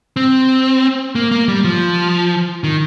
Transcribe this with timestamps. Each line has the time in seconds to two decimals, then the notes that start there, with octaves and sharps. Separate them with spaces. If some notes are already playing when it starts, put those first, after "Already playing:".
0.16 C4
1.15 A#3
1.31 A#3
1.48 G3
1.65 F3
2.64 D#3